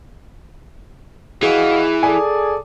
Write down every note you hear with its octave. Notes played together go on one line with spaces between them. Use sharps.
E3 F#4 G#4 D#5 F5
G#4 A4 D5 G#5